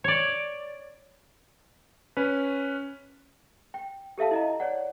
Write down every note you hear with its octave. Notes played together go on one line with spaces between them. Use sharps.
C#5 D5
C#4 B4
G5
G4 A4 E5 F5 A5
E4 D#5 A#5
C#5 D5 F#5